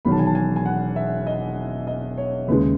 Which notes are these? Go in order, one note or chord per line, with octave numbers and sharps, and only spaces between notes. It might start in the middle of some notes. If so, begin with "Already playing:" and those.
E1 E2 D#3 F#3 B5
A5
G#5
A5
G#5
G#5
F#5
E5
D#5
D#5
C#5
D#2 C#3 G#3 B4